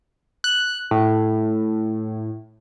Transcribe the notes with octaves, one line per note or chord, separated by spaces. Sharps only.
F#6
A2